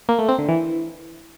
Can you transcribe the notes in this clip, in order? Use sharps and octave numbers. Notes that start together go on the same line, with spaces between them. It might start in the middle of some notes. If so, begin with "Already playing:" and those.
A#3
A3
C4
D3
E3